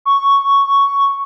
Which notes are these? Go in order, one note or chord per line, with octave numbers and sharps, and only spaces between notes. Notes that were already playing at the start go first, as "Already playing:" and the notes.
C#6